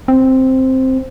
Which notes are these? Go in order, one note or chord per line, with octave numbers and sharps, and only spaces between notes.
C4